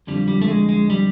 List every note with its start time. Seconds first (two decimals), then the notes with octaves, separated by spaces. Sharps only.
0.07 F2 D3 F3 G3
0.28 G3
0.42 A3
0.48 G#3
0.69 G#3
0.90 G3